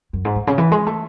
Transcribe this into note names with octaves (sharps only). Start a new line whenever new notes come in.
F#2
G#2
A2
C#3
E3
G#3
A3